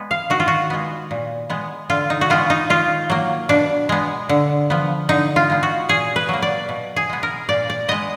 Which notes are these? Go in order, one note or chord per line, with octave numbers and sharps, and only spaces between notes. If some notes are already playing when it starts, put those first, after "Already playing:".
Already playing: G#3 B3
F5
D#3 F#4
F4
F#4
G#3 B3
A#2
G#3 B3
D3 F4
D#4
F#4
G#3 B3 F4
D#4
D#3 F4
F#3 A#3
B2 D4
G#3 B3
D3
F3 B3
D3 D#4
F4
G#3 B3
F#4
A#2 G#4
B4
F#3 A#3
D5
B2
G#4
G#3 B3
A#4
A#2 D5
D5
G#3 B3 D#5